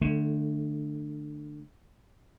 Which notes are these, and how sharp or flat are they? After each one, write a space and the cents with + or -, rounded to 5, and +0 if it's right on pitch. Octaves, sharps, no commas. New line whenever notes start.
D3 +25 A3 +0